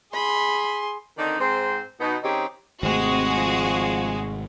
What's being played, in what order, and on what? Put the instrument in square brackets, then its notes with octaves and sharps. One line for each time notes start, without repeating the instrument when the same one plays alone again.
[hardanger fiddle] G#4 C6 [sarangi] B5
[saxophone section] D3 D#3 C4 D4 D#4
G#2 C4 C5
B2 B3 D#4
D#3 C4 C#4 D#4 G4 G#4
[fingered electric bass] G#1 C3 A3 [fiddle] G#3 [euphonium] C4 [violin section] F#4 G#4
[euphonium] F3